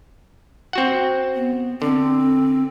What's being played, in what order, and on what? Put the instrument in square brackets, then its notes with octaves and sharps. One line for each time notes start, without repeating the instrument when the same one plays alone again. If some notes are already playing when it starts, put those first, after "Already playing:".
[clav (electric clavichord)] C4 F#4 F#5
[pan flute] B3
[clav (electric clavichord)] D3 [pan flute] C4